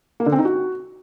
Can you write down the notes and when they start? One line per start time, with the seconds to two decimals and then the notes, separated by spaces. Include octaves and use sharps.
0.20 A#3
0.26 D3
0.32 C4
0.39 D#4
0.45 F#4